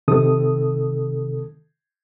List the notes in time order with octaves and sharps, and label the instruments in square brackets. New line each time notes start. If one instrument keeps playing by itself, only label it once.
[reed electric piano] C3 D#3 A4 D#6